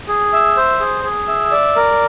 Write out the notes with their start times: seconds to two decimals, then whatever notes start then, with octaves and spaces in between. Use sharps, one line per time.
0.08 G#4
0.33 E5
0.57 C5
0.80 G#4
1.04 G#4
1.28 E5
1.51 D5
1.76 A#4